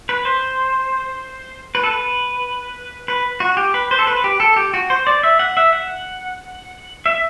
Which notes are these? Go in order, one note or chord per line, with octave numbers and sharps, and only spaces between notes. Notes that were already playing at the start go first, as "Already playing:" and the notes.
B4
C5
B4
A4
B4
B4
F#4
G4
B4
C5
A4
B4
G4
A4
G4
F#4
C5
D5
E5
F#5
E5
F#5
E5